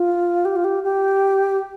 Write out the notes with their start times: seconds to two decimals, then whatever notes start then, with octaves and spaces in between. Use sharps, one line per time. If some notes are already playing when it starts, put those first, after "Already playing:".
Already playing: F4
0.45 G4
0.56 F4
0.64 G4
0.83 G4